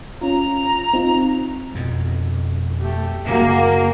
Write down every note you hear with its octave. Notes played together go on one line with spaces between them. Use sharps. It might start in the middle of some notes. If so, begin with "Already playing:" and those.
C#4 F4 A#5
C4 D#4 F4
F2 B2
A3 G4
F#2 C#3 A#3 F#4 G#4